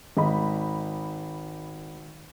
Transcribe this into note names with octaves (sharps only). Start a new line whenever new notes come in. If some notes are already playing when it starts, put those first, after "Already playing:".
G#1 D#5 B5